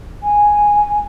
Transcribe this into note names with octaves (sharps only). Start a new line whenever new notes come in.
G#5